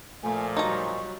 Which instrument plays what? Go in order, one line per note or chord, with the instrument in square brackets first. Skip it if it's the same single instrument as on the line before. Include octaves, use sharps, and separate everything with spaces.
[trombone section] A#2 F3 [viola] A3 [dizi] G#5
[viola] F#3 G3 [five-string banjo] D#4 A#5 [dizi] C#6